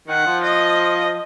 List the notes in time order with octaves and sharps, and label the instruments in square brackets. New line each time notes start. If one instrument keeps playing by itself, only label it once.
[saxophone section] D#3 [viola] F#5
[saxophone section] F3
[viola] D#5